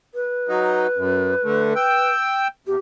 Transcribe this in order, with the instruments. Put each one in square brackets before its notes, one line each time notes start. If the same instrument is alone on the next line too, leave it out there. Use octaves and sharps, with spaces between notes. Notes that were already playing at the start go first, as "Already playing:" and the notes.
[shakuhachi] B4
[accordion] F#3 D#4
F#2
D3 A3
G5 E6
[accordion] E2 [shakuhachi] G4